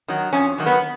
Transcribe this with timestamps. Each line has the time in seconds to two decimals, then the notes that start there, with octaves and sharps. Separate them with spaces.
0.08 D#3 F#3
0.33 F2 C#4
0.58 D#3 F#3
0.66 B3